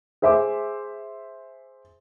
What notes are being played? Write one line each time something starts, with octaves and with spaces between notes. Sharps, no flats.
G#4 C5 E5 C6 D6